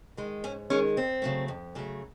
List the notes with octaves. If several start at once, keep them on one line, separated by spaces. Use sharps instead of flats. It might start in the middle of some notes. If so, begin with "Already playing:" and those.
D#3 G#3
G#2 C#4
D#3 G#3 C#4
F2 C4
C#3 F#3 A3
F2
C#3 F#3 A3